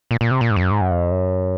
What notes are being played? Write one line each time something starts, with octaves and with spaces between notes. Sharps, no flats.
A#2
A#2
C3
A#2
G#2
F2
F#2
G#2
F#2
F2
F#2